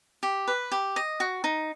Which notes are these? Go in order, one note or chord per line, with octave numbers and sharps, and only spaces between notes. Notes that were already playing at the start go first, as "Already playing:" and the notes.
G4
B4
G4
D#5
F#4
D#4